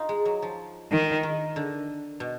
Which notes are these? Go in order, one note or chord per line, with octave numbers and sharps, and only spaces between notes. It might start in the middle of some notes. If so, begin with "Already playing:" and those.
Already playing: D#4 F4
G#3
F#3
F3
D#3
D#3
D3
B2